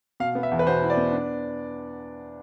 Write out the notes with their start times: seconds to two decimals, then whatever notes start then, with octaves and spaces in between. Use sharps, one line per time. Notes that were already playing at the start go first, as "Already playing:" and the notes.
0.20 B2 F5
0.35 B3
0.43 E5
0.51 E2
0.59 B4
0.67 B2 C5
0.82 E4
0.90 D5
0.97 B3
1.12 D4